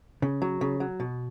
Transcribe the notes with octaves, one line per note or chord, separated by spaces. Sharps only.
C#3
F#3
C#3
F#3
B2